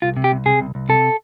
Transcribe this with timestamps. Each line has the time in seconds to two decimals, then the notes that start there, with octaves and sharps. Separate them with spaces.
0.02 C2 F4
0.17 C3
0.24 G4
0.32 C2
0.46 C3 G#4
0.61 C2
0.75 C2
0.89 C3 A4